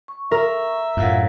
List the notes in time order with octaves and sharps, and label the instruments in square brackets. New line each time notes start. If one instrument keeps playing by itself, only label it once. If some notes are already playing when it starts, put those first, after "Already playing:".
[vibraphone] C#6
[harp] A#4 [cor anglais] E5
[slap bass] F#2 A2 [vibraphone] F4 F5 F#5